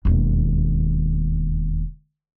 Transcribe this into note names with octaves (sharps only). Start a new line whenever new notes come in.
E1 D#2